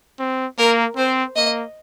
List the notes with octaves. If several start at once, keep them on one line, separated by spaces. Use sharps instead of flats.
C4
A#3 A#4
C4 C5
A#3 D#5